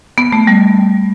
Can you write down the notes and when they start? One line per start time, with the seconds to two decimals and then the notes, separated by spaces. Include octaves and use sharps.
0.18 B3
0.33 A3
0.47 G3